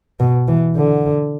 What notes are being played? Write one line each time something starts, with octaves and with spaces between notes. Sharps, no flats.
B2
E3
D3